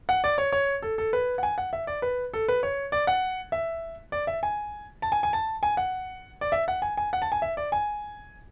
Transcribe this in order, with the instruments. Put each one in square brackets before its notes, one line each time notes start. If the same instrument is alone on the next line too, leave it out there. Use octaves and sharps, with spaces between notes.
[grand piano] F#5
D5
C#5
C#5
A4
A4
B4
F#5
G#5
F#5
E5
D5
B4
A4
B4
C#5
D5
F#5
E5
D5
E5
G#5
A5
G#5
G#5
A5
G#5
F#5
D5
E5
F#5
G#5
G#5
F#5
A5
G#5
E5
D5
G#5